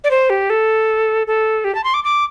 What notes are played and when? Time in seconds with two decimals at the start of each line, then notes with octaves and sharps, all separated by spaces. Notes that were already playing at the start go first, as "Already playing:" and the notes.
0.04 D5
0.11 C5
0.30 G4
0.50 A4
1.27 A4
1.64 G4
1.75 A5
1.84 C6
1.94 D6
2.04 D6